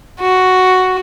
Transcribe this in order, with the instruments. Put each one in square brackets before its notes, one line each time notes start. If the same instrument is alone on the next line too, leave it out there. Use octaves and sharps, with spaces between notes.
[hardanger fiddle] F#4